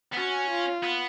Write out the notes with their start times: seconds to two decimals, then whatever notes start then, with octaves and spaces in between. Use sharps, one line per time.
0.13 B3
0.17 C#4 F#4
0.50 F4
0.83 B3